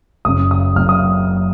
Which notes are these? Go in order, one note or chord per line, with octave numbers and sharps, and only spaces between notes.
F#1 F#2 C#3 D#6
D#6
F#1 F#2 C#3 F6
D#6